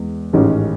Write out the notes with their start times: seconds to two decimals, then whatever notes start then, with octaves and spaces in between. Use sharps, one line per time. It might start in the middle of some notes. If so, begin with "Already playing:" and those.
Already playing: E2 G#3
0.33 A1 G#2 D#3 G#3 C#4